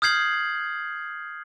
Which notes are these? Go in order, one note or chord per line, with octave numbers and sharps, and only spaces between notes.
D#6 F6 G6 G#6 C7 F#7